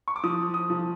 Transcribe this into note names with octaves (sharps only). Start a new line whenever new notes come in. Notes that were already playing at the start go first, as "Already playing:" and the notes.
C#6
D6
F3 D#6
D#6
F3